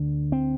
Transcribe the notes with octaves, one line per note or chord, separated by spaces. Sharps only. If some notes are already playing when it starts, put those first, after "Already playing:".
Already playing: D2 D3
C4